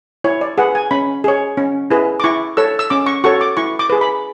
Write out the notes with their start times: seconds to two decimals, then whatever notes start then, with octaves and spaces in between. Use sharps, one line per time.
0.24 E4 C#5
0.41 D5
0.58 G#4 B4 F#5
0.75 G#5
0.91 C#4 B5
1.24 G#4 C#5
1.57 C#4
1.91 E4 G#4 B4
2.20 D6
2.24 E4 C#6
2.57 A4 C#5 E6
2.79 E6
2.90 C#4 D6
3.06 C#6
3.24 F#4 A4 C#5 C#6
3.41 D6
3.57 E4 C#6
3.79 D6
3.90 G#4 B4
4.01 B5